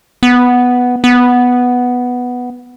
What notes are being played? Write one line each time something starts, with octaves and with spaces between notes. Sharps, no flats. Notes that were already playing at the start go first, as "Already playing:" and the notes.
B3
B3